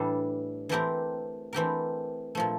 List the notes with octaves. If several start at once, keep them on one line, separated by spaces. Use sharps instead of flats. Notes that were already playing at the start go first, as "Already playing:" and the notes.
Already playing: A2 E3 G3 D4 A4
E3 A3 C4 G4 A#4
E3 A3 C4 G4 A#4
A#2 F3 A3